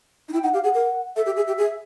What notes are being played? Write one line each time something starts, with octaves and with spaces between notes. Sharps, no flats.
D#4
E4 G5
D#4 F#5
G4 F5
G#4 F#5
A#4
A4 E5
G4
G#4
G4
G#4